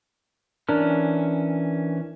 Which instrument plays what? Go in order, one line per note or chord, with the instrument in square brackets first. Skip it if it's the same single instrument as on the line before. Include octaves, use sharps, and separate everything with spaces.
[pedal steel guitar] E3 C#4 F6 [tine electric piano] D4 A#4